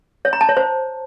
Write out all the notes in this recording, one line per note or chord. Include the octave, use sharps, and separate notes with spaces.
C#5
A#5
A5
C#5
C5